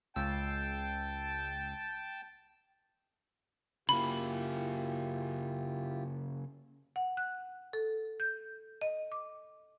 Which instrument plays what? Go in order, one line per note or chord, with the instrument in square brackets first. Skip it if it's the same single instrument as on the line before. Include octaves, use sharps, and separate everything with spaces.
[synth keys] C#2 E6 C7 [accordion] G5 A5
[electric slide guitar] C#3 A#3 [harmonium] E4 F4 G4 [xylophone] B5
[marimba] F#5
F#6
A4
G6
D#5
D6